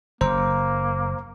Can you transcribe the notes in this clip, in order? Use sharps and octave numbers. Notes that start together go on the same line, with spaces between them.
F#1 A#3 C5 A#5